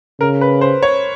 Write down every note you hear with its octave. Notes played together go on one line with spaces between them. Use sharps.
C#3 A#4
B4
C5
C#5